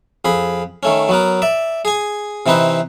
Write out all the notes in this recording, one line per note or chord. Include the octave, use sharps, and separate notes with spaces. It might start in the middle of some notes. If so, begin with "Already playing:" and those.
F2 G#4 B5
D#3 A3 C#4
F#3 B3 A#4
D5 E5
G#4 G#5
C3 E3 C4 D#4 B4